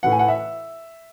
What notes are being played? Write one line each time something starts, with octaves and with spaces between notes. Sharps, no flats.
A2 E3 F#5
G#5
F#5
E5